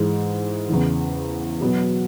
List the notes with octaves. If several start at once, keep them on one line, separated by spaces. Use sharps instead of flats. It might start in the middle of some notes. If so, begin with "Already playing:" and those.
Already playing: G#2 E3 G#3
E2 C#3 E3
B2 F#3 B3 F#4